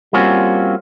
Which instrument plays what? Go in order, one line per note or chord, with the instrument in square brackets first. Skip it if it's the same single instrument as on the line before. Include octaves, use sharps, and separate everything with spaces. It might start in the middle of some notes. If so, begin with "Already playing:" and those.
[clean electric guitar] G3 A#3 C4 C#4 F4 F#4